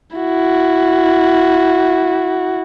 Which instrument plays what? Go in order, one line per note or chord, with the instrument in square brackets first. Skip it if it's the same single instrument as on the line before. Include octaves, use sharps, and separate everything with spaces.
[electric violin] E4 F#4